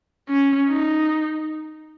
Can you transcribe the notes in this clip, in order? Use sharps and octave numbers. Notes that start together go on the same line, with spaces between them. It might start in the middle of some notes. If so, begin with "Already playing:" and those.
C#4
D#4